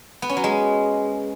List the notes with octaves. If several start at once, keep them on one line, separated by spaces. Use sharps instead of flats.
B3
C#4
F#3
G#3